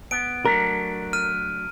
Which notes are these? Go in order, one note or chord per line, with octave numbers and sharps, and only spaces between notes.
B3 D7
F#3 A3 D4 A#4
F6 D#7